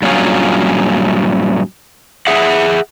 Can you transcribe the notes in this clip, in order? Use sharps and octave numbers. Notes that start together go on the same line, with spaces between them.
G2 A#2 F#3 C#4 F4 G#4
G#4 E5 F#5